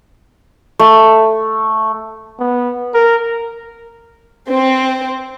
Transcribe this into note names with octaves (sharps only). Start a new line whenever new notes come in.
A3
B3
A#4
C4